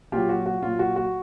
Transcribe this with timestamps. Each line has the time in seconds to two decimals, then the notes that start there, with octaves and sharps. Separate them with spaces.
0.12 A#2 F#3 F4 G4
0.29 F#4
0.46 F#4
0.62 A#2 F#3 F4
0.79 F#4
0.96 F#4